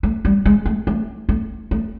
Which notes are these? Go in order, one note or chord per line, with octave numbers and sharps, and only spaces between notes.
A3
G3
G#3
A3
A3
A3
A3